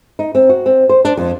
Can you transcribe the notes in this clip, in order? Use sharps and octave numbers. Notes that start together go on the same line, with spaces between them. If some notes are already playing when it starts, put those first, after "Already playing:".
D#4
C4
F#4
C4
C5
D4
F2